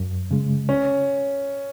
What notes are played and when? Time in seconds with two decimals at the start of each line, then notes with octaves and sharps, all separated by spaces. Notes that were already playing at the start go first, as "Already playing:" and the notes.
Already playing: F#2
0.31 C#3 G#3
0.69 C#4